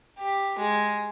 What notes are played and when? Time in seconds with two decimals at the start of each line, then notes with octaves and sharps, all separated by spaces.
0.19 G4
0.59 G#3